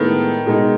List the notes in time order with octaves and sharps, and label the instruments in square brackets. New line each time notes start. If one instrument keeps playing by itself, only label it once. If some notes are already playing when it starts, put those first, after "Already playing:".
Already playing: [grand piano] A2 G#3 B3 E4 A4 [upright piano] D#3
[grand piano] B2 G#3 D#4